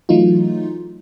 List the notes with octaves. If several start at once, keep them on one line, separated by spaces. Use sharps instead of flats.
E3 F#3 A3 D#4 F4